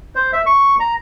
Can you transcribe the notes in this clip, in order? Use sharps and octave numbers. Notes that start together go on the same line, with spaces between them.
C5
E5
C#6
A#5